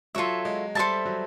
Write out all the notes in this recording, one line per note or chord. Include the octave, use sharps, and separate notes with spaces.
F#3 F4 A4 C#5 E5
G#3
G3 A4 C5 E5 A5
F#3